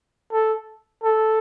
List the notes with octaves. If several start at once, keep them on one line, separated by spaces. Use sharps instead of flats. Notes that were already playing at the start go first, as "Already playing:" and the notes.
A4
A4